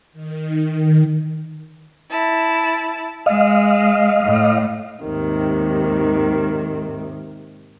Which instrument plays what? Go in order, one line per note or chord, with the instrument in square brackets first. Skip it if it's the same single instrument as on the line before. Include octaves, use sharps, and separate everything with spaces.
[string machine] D#3
[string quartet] E4 A5
[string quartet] G#3 [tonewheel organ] D#5 F5
[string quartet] A2
D#2 G#2 C3 D#3